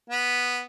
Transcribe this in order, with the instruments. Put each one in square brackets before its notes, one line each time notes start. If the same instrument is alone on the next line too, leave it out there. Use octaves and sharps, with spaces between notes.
[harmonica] B3